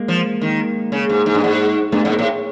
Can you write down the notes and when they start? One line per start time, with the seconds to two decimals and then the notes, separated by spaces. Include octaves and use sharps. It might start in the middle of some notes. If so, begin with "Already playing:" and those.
Already playing: G#3 A#3
0.08 F3
0.41 D#3
0.92 C#3
1.09 G#2
1.26 G#2
1.34 G2
1.44 G#2
1.92 G2 A3 B3
2.04 G#2 C#4
2.10 A#3 C4
2.19 A2